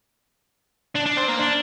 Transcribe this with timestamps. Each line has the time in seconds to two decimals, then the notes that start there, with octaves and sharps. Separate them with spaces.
0.96 D4
1.06 D4
1.17 C4
1.29 A#3
1.39 D4